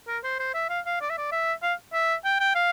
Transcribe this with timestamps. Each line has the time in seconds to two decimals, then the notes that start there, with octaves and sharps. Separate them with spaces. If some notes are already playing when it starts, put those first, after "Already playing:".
0.07 A#4
0.24 C5
0.40 C5
0.54 E5
0.69 F5
0.86 F5
1.01 D5
1.10 E5
1.18 D5
1.32 E5
1.63 F5
1.93 E5
2.24 G5
2.40 G5
2.55 F5